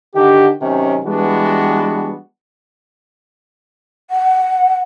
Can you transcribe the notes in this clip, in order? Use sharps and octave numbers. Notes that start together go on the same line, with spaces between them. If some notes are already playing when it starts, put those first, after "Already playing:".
D3 D#3 D4 F#4 G4
C3 D#3 F#3 C#4
E3 G3 G#3 B3 D4 F#4
F#5